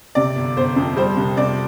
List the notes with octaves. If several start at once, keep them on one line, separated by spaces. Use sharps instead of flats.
C3 D5
G1
G1 C5
F2
G3 C5
C2
C2 D5